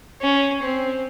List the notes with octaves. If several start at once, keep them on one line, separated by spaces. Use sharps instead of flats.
C#4
C4